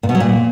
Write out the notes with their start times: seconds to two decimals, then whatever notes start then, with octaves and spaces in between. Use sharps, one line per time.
0.03 A#2
0.09 B2
0.15 F#3
0.20 A#2